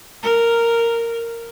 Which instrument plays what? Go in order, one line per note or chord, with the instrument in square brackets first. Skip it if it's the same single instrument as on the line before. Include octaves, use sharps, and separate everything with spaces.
[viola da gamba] A#4